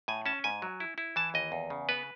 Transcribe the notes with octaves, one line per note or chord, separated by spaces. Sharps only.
A2 G#5
C#4 A5
G#2 G#5
F#3
E4
E4
E3 A5
D#2 D#5
E2
C#3
B3 B4